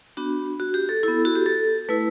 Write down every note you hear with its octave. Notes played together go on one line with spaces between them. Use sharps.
B3 D4 F#4
F#4
G4
A4
B3 E4 A4
F#4
G4
A4
A3 E4 B4